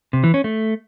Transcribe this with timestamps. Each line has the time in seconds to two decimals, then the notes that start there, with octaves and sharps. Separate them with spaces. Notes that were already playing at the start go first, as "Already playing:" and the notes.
0.13 C3
0.24 E3
0.34 C#4
0.44 A3